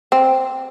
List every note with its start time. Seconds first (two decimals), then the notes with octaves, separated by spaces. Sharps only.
0.12 C4